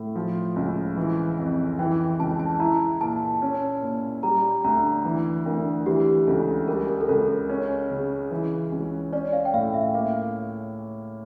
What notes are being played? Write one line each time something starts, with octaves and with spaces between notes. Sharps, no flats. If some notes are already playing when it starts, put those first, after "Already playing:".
Already playing: A2
F3
C#2
E3
F2
E3 G5
C#2 A5
A5
E4 A#5
A#2 A5
C#4
A#2
G3 A#5
D2 A#5
E3
D2 A#4
E3 G4
C#2 A4
G3 A#4
A#4
A4
C#2 A#4
C#4
C#3
E3
C#2
C#4 D5
F5
G5
A2 F5
E5
A#3 F5